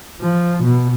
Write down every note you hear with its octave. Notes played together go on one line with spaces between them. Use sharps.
F3
B2